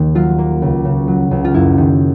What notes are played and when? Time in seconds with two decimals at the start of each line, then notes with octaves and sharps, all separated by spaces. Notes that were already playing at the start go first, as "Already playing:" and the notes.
Already playing: D#2 D#3 A#3
0.15 F#3 F4
0.38 A#3
0.62 C#2
0.85 C#3
1.08 F#3
1.31 C#2
1.44 F4
1.54 F#2 E4
1.78 D#3